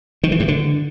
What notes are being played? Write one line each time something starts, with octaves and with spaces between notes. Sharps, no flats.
D#3
E3
G2
D3